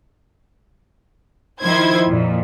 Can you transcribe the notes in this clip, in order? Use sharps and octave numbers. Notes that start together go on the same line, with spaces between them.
D#3 F3 E4 C5 G#6
F2 A#2